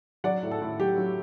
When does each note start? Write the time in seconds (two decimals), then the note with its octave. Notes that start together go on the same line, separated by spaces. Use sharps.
0.24 F#3 D5 F#5
0.43 A2
0.51 A4
0.62 A2
0.79 F#3 G4
0.98 F#3